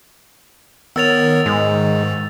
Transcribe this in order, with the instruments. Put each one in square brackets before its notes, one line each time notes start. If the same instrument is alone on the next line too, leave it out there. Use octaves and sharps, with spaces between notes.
[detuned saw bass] D#3 [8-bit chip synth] B3 A#4 C#5 [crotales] E6 A6 F7
[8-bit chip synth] G#2 [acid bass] G#3